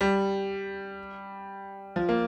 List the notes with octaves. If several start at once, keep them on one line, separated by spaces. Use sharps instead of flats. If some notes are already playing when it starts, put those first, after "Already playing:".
G3
F3
A#3